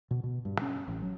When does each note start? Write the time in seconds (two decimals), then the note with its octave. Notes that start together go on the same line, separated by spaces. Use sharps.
0.11 B2
0.24 B2
0.45 G2
0.62 C#4
0.88 A1
1.02 F#3